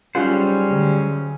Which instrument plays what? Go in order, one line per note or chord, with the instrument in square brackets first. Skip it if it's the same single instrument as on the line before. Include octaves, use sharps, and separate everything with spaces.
[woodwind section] C#3 F#3 C#4 [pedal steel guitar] G3 C5 [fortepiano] D#4 F4 F#5
[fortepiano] D2